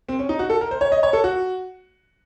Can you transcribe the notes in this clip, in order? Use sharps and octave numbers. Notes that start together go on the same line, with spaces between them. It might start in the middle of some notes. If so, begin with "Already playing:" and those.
C4
C#4
D#4
F#4
A4
A#4
C5
C#5
D#5
C#5
A4
F#4